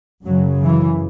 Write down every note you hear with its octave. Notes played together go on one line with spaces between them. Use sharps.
F#2 C#3 F#3
E3